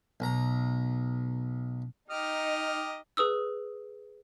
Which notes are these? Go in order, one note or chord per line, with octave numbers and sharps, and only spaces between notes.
B1 A#5
D#4 G4 D#5 F6
G#4 B4 D#6 E6